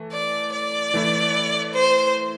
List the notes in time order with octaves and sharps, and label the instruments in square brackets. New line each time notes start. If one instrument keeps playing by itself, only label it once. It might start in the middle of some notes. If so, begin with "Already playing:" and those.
Already playing: [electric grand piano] E3 A3
[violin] D5
D5
[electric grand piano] E3 A3 E4
[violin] C5